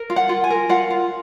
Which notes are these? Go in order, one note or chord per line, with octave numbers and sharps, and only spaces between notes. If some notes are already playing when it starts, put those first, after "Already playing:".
Already playing: A#4
F4
F#5
F4
G#5
A#4
F4 F#5
F4